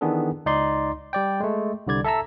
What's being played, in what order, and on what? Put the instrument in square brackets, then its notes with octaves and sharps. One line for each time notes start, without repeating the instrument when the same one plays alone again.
[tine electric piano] D#3 E3 B3 D4 G#4 A4
C#2 D#4 D5 C6
G3 D5 G5
G#3 A3
C2 D3 G3 D5 G#6
A4 E5 A5 A#5 E6